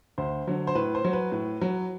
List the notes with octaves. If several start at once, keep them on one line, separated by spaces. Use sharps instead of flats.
D2 C5
D3 F#3
C5
A2 B4
C5
F#3
B4
A2
F#3